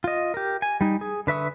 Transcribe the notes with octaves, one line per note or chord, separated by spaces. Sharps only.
F4 D#5
G4 A#4
G#5
G3 D#4
G#4
D3 B4 E5 C#6 D#6